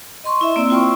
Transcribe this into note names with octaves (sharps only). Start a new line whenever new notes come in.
D#5 C6 C#6
E4 E5
A#3 C4 D5 E6
F4 C5 G5 C6 C#6